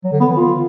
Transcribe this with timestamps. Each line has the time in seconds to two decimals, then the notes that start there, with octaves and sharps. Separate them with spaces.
0.04 F#3
0.12 D3
0.20 B3
0.28 E3
0.36 F4